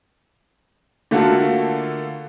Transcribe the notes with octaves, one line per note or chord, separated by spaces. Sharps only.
D3 A3 A#3 F4 F#4 A4